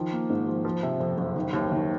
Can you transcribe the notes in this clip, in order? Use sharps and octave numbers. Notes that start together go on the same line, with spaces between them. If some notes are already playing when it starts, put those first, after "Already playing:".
Already playing: D#3 F3
A#3
G#2
F3
F3
C3
F2
F#1
D#3
D#2
D#3